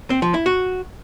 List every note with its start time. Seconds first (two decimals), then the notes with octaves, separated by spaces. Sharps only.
0.10 C4
0.22 F3
0.34 E4
0.46 F#4